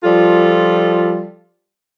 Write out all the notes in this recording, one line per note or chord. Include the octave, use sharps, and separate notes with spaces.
F3 G3 F4 A4